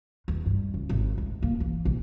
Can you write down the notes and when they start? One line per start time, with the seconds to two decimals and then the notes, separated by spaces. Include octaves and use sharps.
0.28 E2
0.46 G2
0.74 C#2
0.89 G#1
1.18 D2
1.43 A#3
1.60 E3
1.85 A#1